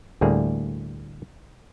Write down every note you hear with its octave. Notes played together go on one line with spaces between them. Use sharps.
D2 A2 G3 A#3 G#4